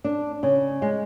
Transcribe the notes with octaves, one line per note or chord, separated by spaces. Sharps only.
D4
C#3
G#3